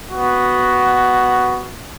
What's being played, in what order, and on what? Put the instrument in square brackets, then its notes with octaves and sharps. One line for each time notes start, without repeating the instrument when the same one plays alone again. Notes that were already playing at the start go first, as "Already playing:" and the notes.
[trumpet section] B3 F#4